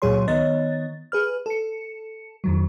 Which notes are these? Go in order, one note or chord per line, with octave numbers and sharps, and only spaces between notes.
C#2 A#2 F#3 G#4 C#5 C6
D#3 B3 C#5 D#5 A6
G#4 B4 F6
A4 C#7
F2 D#3 F#3